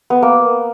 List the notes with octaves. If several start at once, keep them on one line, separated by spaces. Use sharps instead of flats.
B3
A#3